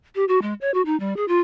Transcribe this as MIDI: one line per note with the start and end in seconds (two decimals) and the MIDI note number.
0.15 0.25 67
0.28 0.41 66
0.42 0.54 56
0.61 0.73 73
0.74 0.82 66
0.86 0.98 63
1.00 1.16 55
1.17 1.27 68
1.28 1.40 65